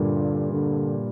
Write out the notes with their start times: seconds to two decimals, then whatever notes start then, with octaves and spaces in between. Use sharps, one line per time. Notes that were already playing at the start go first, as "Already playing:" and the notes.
Already playing: G2 A#2 D3
0.53 D3